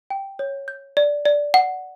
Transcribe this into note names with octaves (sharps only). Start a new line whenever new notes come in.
G5
C#5
G6
D5
D5
F#5